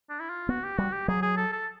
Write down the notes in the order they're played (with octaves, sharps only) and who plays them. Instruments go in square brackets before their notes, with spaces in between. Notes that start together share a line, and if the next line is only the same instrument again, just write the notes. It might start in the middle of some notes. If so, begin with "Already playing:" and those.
[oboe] D4
E4
F4
[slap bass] B3 [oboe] F#4
[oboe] G4
[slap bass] G3 [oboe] F#4
[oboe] G4
[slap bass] F#3 [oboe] G#4
[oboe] G#4
A4
A4